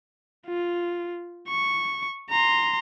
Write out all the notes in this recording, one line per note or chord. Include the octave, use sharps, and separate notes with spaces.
F4
C#6
A#5 C6